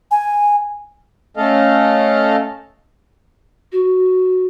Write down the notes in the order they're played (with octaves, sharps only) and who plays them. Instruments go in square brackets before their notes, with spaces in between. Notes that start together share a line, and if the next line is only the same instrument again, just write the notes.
[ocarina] G#5
[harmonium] A3 C#4 A4 D#5 F5
[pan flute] F#4